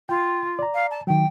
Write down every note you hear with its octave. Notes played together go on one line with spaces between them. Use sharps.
F4 G5
D5 A#5
F5
A5
D#3 F#3 G5